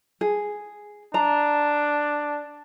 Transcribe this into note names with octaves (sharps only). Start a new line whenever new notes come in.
G#4
D4 A#5